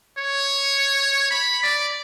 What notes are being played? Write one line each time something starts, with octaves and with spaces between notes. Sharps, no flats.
C#5
B5
D5